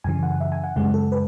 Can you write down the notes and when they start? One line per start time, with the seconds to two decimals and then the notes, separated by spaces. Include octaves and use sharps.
0.04 F#2 C#3 E3 G#5
0.23 F#5
0.40 E5
0.52 G#5
0.64 F#5
0.76 F#2 C#3 G#3 F#5
0.94 A4
1.12 B4